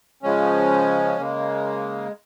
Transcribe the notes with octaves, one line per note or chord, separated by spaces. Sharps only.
C#3 F3 G#3 C#4
C#3 G#3 A#3